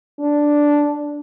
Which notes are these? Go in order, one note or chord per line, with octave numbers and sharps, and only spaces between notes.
D4